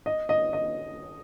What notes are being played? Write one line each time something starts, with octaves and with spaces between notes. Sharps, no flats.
D#5
D#5
D#5